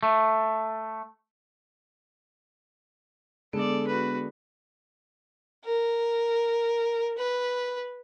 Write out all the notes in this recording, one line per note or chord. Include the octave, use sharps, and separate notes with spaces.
A3
D3 G#3 B3 D4 A4 D5
F#4 B4
A#4
B4